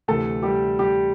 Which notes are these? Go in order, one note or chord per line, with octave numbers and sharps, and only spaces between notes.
D2 C3 E3 A3 A4
G3 G4
G3 G4